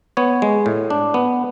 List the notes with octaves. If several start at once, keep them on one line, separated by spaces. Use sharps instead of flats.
B3 C#5
G#3
A2
D4
B3